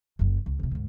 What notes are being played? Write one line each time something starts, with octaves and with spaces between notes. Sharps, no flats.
F#1 F#2
C#2
D2 C3
D2 G#2